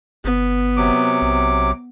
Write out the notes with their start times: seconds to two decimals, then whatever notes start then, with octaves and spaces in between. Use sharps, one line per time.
0.25 G1 B3
0.77 C3 F#3 D6
1.22 B1